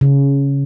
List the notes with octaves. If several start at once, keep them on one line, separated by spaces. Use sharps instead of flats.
C#3